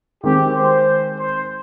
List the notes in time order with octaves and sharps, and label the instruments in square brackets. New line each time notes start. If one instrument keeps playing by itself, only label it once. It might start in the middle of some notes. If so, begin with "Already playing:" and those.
[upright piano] D#3 G#3 C4 [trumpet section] G4
[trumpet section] C5
C5